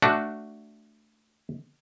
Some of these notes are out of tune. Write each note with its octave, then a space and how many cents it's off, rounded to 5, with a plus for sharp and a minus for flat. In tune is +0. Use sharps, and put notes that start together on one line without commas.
A3 +0 D4 +0 F#4 +0